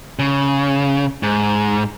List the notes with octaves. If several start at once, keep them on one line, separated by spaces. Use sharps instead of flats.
C#3
G#2